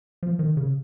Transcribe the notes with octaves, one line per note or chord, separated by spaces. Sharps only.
F3
D#3
C#3